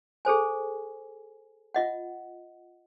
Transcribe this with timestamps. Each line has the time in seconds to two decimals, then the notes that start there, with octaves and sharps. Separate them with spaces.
0.25 G#4 A4 C5 G#5
1.74 F4 D#5 F#5